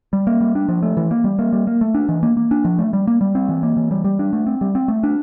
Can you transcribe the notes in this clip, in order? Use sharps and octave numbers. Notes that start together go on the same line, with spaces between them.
G3
A#3
G3
D4
F3
A3
E3
A#3
G3
A#3
G3
A#3
A3
D4
E3
A#3
A#3
D4
F3
A3
G3
A#3
G3
C4
E3
A#3
E3
G3
G3
D4
A3
C4
G3
C4
A3
D4